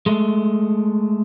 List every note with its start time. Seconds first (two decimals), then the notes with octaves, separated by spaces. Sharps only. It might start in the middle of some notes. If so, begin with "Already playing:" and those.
0.06 G#3 A3